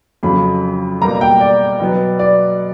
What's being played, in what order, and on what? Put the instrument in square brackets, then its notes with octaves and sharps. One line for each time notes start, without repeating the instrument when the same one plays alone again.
[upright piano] F2 C#3 F#3 B5
B2 G3 A#3 A#5
G5
D5
B2 F#3 B3
D5